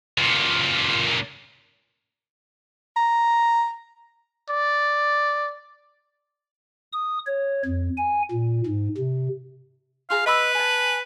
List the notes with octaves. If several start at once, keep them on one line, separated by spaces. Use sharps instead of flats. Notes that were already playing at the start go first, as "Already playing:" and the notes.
C#2 A#2
A#5
D5
D#6
C#5
F2
G#5
A#2
G#2
C3
F4 G#4 F5 A#5
B4 D#5 B5 E6
G#5 A5